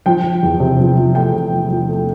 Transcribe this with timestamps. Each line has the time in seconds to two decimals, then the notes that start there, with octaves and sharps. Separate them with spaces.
0.06 F3 G5
0.24 F3
0.43 E2
0.60 C3
0.80 F3
0.97 F3
1.15 A3 G5
1.33 C3
1.52 F3
1.70 F3
1.88 A3